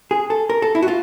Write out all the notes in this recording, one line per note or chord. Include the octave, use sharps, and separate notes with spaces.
G#4
A4
A#4
A4
E4
F#4
F4